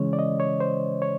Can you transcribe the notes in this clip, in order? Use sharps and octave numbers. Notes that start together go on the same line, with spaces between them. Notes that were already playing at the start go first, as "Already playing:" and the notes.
Already playing: C#3 E3 G#3 C#4 C#5
D5
D#5
C#5
C5
C#5